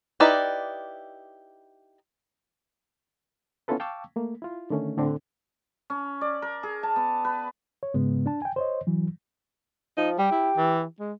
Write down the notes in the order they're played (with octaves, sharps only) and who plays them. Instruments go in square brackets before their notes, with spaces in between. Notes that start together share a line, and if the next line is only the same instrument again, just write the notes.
[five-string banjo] D#4 E4 G4 B4 D5
[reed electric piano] B3 C#4 E4 F4 A4 B4
F5 G5 A5 C#6 D6 E6
A3 A#3
E4 F4
D3 D#3 A3 C#4
A2 D3 C4 D4
[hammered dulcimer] C#4
D5
A#4
G#4
A5
B3
B4
[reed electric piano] C#5
G#2 C#3 G#3 B3
D4 A5
G5 G#5
C5 C#5 D#5
E3 F#3
[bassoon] F3 [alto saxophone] D#4
[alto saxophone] G3 [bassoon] G4
[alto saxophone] E4
E3
G#3